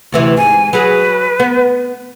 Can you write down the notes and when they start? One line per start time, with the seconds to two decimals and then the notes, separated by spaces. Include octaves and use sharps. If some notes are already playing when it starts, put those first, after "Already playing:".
0.12 D2 C3 E3
0.37 G#2 G#5
0.73 F#3 G#4 B4
1.40 B3